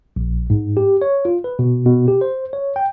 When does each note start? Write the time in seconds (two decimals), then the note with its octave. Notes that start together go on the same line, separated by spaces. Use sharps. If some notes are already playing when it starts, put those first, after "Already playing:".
0.16 A#1
0.50 G#2
0.77 G4
1.02 C#5
1.25 F4
1.44 B4
1.59 B2
1.86 B2
2.08 G4
2.21 C5
2.53 C#5
2.76 G5